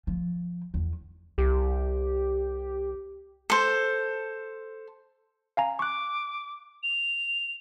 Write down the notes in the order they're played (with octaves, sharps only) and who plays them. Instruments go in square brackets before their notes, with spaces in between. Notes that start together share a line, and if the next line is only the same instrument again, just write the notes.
[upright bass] F3
E2
[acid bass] C2 [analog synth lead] G4
[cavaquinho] A4 C5
[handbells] F5 G#5 A#5
[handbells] C#6 F#6 [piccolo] D6
[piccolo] F7